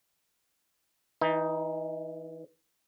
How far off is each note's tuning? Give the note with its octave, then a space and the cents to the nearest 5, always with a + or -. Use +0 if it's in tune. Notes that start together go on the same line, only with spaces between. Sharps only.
E3 -20 D#4 +10